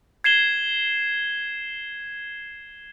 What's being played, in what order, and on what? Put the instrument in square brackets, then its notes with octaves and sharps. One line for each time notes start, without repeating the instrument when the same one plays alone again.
[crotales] G#6 C7 E7 G7